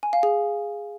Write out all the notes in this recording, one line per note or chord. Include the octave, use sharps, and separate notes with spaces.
G#5
F5
G#4